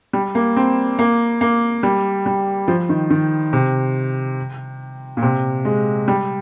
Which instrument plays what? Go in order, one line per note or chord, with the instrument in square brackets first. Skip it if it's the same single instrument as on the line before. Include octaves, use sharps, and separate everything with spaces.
[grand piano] G3
A#3
C4
A#3
A#3
G3
G3
F3
D#3
D#3
C3
A#2
C3
G#3
G3